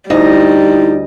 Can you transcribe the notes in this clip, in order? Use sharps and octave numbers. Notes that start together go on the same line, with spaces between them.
D2 G3 D#4 E4 D#5